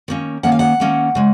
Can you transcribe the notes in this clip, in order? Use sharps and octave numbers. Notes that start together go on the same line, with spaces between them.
D#3 A#3 C#4
D#3 A#3 C#4 F#5
F5
F#5
D#3 A#3 C#4
C#3 G#3